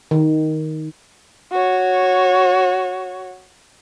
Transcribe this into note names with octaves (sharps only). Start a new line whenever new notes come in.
D#3
F#4 C#5